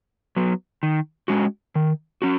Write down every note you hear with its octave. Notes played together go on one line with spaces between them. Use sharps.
F#3 B3
D#3
G#3 C#4 F#4
D#3
C#4 F#4